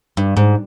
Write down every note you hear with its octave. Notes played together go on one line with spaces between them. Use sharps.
G2
G#2